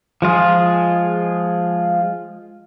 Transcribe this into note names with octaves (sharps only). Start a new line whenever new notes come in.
F3 G#3 F4 G#4